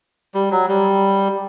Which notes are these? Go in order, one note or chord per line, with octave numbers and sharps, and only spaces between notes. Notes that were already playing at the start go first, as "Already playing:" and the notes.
G3
F#3
G3